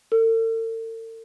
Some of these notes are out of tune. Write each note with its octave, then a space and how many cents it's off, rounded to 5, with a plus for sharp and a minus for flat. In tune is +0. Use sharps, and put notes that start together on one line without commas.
A4 +45